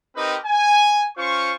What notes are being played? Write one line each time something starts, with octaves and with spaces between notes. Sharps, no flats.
C4 D#4 G4 A#4 B4 D#5
G#5
C#4 F4 C5 C#6